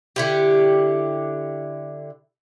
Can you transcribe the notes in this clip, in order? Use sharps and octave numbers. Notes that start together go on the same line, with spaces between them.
D3 E4 G4